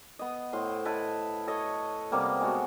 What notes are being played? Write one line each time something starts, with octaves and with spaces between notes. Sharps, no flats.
B3 D#5
A2 C5 C6
E4 A4 B4 D#5
A4 C#5 D#5
C3 G3 A#3 B3
G#3 B3 F#4 A4